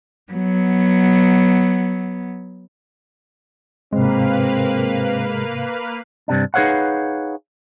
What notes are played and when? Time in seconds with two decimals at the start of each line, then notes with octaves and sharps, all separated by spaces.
0.32 F#3 B3
3.93 G#2 C3 G#3 A#3 C4 B4 F5
6.28 G2 C3 D4
6.54 D#4 G#4 B4 C#5 F5 F#5